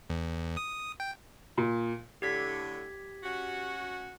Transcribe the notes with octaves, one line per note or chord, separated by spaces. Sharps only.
E2
D#6
G5
A#2
A2 D3 G4 G#6 B6
C#4 F#4